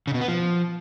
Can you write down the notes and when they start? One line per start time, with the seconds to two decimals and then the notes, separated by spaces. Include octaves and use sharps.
0.07 C#3
0.14 B2
0.21 B3
0.28 F3